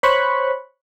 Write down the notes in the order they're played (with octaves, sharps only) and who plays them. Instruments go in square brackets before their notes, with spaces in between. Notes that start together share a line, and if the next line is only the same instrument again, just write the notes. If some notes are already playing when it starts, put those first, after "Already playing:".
[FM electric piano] C5 C#5 B5 C#6 F#6